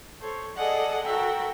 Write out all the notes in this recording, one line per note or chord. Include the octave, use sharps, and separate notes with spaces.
A4 C5 C#5
G#4 A4 D5 D#5 F#5 G#5
F#4 A4 A#4 E5 F#5 G5